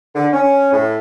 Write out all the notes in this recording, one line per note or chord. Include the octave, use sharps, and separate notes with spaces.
D3
C#4
A2